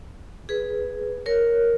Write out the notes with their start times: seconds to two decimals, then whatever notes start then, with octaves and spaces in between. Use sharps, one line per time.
0.49 G#4 B4
1.26 A#4 C#5